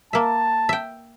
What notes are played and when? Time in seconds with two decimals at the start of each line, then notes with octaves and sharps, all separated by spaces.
0.13 A#3 E5 A5
0.69 E5 G5